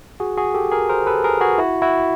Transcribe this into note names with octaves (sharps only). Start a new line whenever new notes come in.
F#4 G#4
F#4 G#4
G4 A4
G#4 A#4
A#4 C5
A4 B4
G#4 A#4
F#4 G#4
E4 F#4
E4 F#4